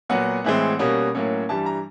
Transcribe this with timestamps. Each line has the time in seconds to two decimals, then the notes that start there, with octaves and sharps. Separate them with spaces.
0.09 A#2 F#3 B3 F#5
0.44 A2 E3 G#3 C4
0.79 B2 G3 A#3 C#4
1.15 A2 F#3 A#3 C#4
1.49 G2 E3 G3 A5
1.66 A#5